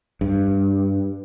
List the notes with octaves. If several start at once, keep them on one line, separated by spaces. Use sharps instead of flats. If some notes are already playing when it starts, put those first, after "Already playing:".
G2